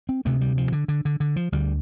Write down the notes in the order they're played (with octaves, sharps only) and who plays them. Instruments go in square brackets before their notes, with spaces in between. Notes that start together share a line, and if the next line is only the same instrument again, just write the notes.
[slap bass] C4
D2 C3 A3
G3
F3
D3
D3
D3
D3
F3
D2 D3 G3